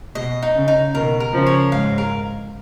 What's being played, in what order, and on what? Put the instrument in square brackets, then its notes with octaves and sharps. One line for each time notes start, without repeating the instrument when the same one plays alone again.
[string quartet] B2 [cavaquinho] D#5
[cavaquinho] D#4
[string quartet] C#3
[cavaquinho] D#4
[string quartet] B2 D#3 [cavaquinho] A#4
[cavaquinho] A#4
[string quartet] C#3 F3
[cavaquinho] C#5
[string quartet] G#2 [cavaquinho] F5
[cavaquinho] A#4